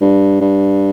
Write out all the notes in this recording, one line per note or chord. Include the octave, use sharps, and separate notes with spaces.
G2
G2